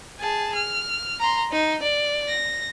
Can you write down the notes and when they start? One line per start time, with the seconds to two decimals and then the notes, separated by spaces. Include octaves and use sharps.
0.20 G#4 A5
0.55 F6
1.20 A#5 C6
1.52 D#4
1.82 D5
2.28 A#6